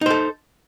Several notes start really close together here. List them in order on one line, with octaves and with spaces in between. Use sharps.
D#4 C5 A4